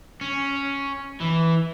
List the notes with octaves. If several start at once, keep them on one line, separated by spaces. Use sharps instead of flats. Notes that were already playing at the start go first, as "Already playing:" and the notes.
C#4
E3